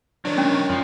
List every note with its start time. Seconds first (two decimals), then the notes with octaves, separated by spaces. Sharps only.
0.25 D#3 F#3 D4 C#5
0.38 C#4
0.69 F#2 F3